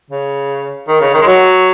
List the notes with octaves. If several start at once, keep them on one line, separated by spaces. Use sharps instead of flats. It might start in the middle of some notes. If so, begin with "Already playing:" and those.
C#3
D#3
C#3
D#3
G#3
F#3